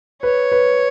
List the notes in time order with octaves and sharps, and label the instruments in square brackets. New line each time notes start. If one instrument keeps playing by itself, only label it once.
[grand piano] B4 [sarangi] C#5
[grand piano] B4